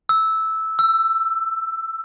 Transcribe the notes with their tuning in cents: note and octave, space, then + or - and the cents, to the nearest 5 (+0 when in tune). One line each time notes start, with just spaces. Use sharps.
E6 -10
E6 +15